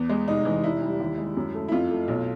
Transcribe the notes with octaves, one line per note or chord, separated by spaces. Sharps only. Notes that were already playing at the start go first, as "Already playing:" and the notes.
Already playing: E2 B3
G#3
F1 D#4
E3
F1 E4
G3
D#2
G#3
F#2
A3
E4
F2 F4
A3
B1